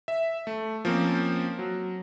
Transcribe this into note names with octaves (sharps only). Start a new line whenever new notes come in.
E5
A3
F3 A#3 C4 C#4
F#3